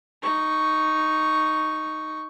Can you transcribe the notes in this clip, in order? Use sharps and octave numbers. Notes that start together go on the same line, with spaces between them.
D#4 C#6